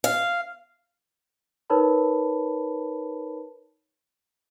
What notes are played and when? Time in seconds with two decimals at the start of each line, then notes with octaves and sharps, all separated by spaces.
0.04 F5
1.70 D#4 A#4 B4 C#5 A5 B5